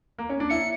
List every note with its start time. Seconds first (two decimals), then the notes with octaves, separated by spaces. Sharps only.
0.18 A#3
0.29 C#4
0.40 D4
0.49 E4 C#7